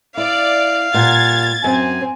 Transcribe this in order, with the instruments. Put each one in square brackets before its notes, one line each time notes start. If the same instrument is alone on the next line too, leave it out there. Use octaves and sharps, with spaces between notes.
[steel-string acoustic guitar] E4 [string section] D5 [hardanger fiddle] F5
[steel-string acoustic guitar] A#2 G3 [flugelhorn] F#5 [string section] G#6 A6
[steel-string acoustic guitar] F#2 [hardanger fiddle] C4 [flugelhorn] G#5